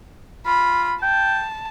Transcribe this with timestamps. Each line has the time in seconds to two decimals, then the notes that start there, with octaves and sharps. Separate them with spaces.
0.46 F4 B5
1.02 G5 A5